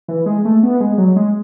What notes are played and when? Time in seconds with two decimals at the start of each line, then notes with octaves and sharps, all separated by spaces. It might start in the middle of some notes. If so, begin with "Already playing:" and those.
0.08 E3
0.26 G#3
0.45 A3
0.63 B3
0.80 G#3
0.98 F#3
1.16 G#3